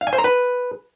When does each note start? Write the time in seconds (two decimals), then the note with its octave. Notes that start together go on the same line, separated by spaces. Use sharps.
0.01 F5
0.07 G#5
0.13 C5
0.18 A#5
0.24 B4